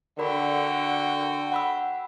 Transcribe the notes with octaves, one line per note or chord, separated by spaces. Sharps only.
D3 F#4 A#4 D5 G5 B5
F#5 B5 E6